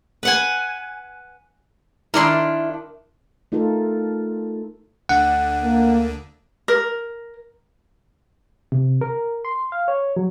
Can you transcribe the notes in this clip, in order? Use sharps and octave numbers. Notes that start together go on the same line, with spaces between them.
B4 F#5 G#5
D#3 D4 E4 A#4 D5 C6
A3 D#4 F4 A4 A#4
D2 D3 F#5
A#3
A#4
C3
A#4
C6
F5
C#5
F#3